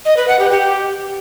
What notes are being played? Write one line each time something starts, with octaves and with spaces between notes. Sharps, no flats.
D#5
B4
F#5
G4
G4